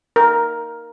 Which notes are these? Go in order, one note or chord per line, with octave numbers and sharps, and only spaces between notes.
A#4